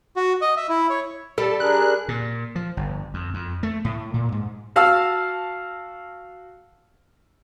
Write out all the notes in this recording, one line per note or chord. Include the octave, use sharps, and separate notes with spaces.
F#4
D#5
E5
E4
C#5
G3 A4
D4 G#4 A#4 F#6
A#2
F3
G1
F2
F2
A3
A2
A#2
G#2
F#4 F5 A5 E6